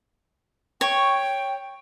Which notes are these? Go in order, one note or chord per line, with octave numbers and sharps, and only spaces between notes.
C#5 G5 C#6